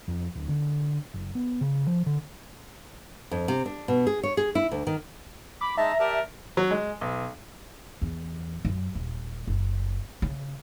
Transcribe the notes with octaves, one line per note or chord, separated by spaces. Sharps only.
F2
D1
D3
F#1
B3
C#3
F3
D3
F2
C3
D4
B2
G#4
C#5
G#4
E4
D2
D#3
B5 D6
G#3 D#4 E5 A5 A#5
G4 A#4 D5 A5
F#3
G#3
B1
E2
F#2
D#1
F#1
C#3